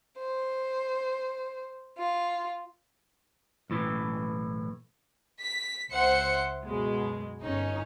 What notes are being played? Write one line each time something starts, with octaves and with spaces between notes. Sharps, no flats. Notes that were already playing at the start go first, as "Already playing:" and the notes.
C5
F4
B1 A2 E3
B6
C#2 C5 E5 F#5 C#7
F#2 B2 G#3
G1 C#4 D#4